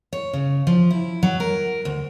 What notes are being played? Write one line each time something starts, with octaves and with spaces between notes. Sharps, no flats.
C#5
C#3
F3
E4
F#3
A#4
D2